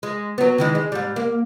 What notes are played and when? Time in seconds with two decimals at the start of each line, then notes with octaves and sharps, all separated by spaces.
0.03 G#3
0.38 F#3 B3
0.58 D#3 E3 G#3
0.75 G#3
0.92 G#2 G3
1.16 A#3